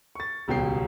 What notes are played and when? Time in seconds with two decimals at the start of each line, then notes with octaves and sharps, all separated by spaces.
0.15 C#6 A6
0.48 D#1 C#2 B2 G5 C7